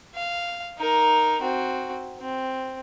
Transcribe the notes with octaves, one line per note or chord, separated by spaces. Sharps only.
F5
D#4 A#4
C4 F#4
C4